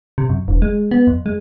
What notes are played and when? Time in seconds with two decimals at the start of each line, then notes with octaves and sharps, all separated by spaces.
0.18 C3
0.29 F#2
0.48 E1
0.62 G#3
0.91 B3
1.07 F2
1.26 G#3